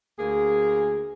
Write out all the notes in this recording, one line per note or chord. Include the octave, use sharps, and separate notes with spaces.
D2 A#3 G#4